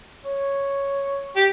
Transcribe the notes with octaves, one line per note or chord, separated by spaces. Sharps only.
C#5
G4